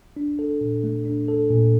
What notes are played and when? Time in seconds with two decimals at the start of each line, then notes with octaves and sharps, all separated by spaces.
0.16 D4
0.39 A4
0.61 A#2
0.84 A3
1.05 D4
1.28 A4
1.50 A#2